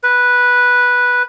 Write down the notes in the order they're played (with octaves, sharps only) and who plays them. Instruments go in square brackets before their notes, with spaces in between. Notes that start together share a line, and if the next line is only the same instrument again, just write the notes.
[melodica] B4